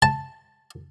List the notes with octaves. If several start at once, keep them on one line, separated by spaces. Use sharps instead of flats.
A5